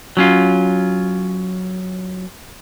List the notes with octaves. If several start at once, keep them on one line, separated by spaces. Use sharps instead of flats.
F#3 C#4 F4